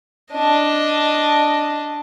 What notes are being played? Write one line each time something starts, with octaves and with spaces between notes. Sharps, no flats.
D4 D#5